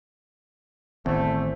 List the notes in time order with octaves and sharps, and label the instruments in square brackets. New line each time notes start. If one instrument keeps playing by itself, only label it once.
[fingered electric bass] A1 D#3 C4 [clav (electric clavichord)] E2 [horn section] A3 [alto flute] C5